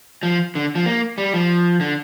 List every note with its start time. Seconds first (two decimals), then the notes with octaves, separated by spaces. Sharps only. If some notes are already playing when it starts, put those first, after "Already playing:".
0.23 F3
0.55 D3
0.75 F3
0.86 A#3
1.18 G3
1.34 F3
1.80 D3